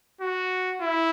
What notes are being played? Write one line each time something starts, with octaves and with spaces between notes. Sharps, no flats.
F#4
E4